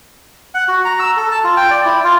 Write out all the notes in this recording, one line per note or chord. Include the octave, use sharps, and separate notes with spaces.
F#5
F#4
A#5
E6
A4
A5
F4
G5
D5
E4
F4